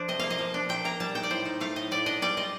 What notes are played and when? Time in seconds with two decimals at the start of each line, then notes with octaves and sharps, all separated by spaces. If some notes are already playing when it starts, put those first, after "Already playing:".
Already playing: F3 A3 D4 C5
0.08 C3 D#5
0.19 A#3 F5
0.31 D#5
0.39 F3
0.54 D4
0.69 A#2 G5
0.84 A#3 A#5
1.00 G3 A5
1.15 D#4 G5
1.23 D5
1.30 A2 C5
1.45 D#4
1.60 A3 F5
1.76 A2 D#5
1.91 A2 D5
2.06 D4 D#5
2.22 G3 D5
2.37 F4 D#5